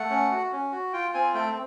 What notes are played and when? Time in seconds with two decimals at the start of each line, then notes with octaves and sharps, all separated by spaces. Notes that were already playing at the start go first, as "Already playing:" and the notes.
Already playing: A3 F#5
0.10 C#4
0.31 F#4
0.52 C#4
0.72 F#4
0.93 F4 G5
1.14 C4 G#5
1.34 A3 G5